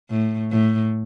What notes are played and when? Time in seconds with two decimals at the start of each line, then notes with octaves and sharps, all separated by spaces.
0.10 A2
0.51 A2